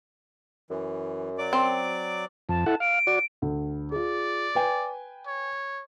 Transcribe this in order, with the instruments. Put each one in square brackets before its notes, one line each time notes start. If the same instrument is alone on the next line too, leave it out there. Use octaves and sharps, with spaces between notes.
[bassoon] F#2 [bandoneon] E3
[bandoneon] F#3 D5 D6
[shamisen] C4
[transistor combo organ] F2 [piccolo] A5
[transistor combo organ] E4 A4 F#5
[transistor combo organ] F5 [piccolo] D7
[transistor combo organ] F#4 D5
[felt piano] D2
[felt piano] F4 G#4 [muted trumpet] D5
[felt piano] B4 G5 G#5
[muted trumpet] C#5